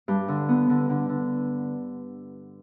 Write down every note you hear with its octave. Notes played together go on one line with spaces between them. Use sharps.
G2
D3
B3
D3
D3
D3